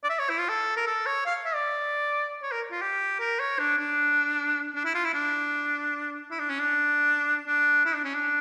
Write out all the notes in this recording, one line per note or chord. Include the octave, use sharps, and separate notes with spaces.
D5
E5
C#5
E4
F4
A4
A#4
A4
C#5
F5
E5
D5
C#5
A#4
F4
G4
A#4
C#5
D4
D4
D4
E4
F4
E4
D4
E4
D4
C#4
D4
D4
E4
D4
C#4
D4